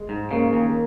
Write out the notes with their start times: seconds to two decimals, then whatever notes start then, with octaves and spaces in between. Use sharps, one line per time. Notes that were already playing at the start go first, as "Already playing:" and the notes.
Already playing: G#3
0.09 G#2
0.31 C#3 A#3
0.53 D#2